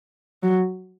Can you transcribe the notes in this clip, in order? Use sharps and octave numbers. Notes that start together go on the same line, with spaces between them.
F#3